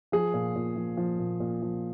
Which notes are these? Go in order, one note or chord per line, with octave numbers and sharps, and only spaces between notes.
F3 G#4
A#2
A#2
F3
F3
A#2
A#2
F3